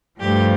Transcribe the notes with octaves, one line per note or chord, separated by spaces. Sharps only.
G2 F3 A3 G4